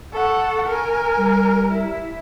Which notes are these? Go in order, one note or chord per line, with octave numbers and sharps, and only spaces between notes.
A4 F#5 C#6
A#4 G#5
G3
E4